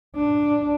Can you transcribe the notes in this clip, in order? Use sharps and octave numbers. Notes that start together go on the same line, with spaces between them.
D4